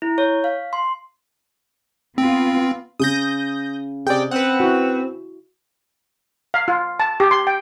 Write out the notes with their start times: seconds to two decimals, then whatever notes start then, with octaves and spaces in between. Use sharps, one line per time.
0.02 E4
0.18 C#5
0.44 F5
0.73 C6
2.18 B3 C4 F4
3.00 C#3 D#6 G6 A#6
4.07 C3 G#4 D5 G5
4.31 C4 B4 F#5
4.60 E4 F#4
6.54 F5
6.68 F4
7.00 A5
7.20 G4
7.31 C6
7.47 G5